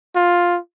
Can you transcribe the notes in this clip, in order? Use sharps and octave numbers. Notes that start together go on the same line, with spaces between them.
F4